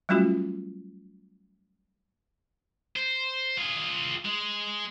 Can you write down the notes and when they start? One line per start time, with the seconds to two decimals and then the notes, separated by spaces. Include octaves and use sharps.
0.09 F#3 G3 A3 C#4 F4 F#4
2.96 C5
3.58 F4 G#4
4.25 G#3